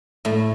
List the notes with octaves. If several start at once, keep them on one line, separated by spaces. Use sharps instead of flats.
A2 A3